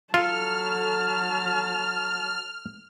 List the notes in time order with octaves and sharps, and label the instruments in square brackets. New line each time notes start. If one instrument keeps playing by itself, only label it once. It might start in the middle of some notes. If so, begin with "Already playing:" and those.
[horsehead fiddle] F#3 A5 [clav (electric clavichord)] F4 [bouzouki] A4 [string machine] F6